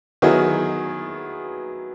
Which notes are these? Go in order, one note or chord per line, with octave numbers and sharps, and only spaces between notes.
D#3 F#3 B3 E4 G#4